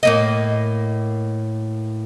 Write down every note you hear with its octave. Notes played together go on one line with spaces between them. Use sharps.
A2 A#3 D#5